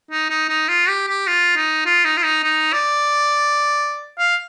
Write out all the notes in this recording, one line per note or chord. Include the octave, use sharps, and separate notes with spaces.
D#4
D#4
D#4
F4
G4
G4
F4
D#4
F4
D#4
F4
D#4
D#4
D5
F5